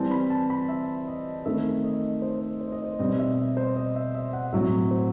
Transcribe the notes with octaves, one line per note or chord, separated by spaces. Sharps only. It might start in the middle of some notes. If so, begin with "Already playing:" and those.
Already playing: E3 G3 C4 A5
B5
A5
B5
E5
D#5
D#3 A3 C4 E5
D#5
C5
C5
D#5
C5
B2 G3 C4 D#5
E5
E5
C5
D#5
E5
E5
F#5
A2 F#3 C4 E5
C5